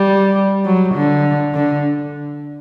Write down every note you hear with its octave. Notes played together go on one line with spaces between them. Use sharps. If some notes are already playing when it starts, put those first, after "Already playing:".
Already playing: G3
F#3
D3
D3